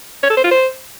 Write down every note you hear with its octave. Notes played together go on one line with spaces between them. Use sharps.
C#5
A4
C5
F4
C5